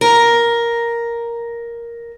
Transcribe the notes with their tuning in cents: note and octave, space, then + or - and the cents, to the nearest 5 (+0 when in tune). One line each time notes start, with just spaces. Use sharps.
A#4 +5